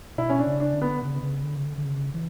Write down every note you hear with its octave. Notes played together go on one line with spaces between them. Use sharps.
B2 E4
C#4
D4
C#3
D4
D3
B3
C#3
C#3
D3
C#3
D3
D3
C#3
E3